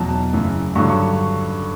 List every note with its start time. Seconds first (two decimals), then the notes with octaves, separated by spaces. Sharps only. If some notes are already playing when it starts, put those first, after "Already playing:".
Already playing: E2 B2 F#3 A5
0.33 F#2 C#3 E3
0.75 G2 D3 F#3 C#6
0.89 C#6